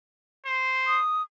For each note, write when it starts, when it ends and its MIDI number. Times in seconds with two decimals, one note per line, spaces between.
0.46 0.99 72
0.87 1.22 87